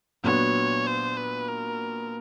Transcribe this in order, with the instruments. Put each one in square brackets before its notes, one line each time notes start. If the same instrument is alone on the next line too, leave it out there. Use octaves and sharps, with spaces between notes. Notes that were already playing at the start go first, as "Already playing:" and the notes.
[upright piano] A#2 F#3 B3 D4 F#4 [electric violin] C#5
[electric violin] C5
B4
A#4